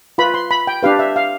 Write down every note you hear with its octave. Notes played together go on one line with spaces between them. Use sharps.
F4 B4 B5
C6
B5
G5
D4 G4 B4 F5
E5
F5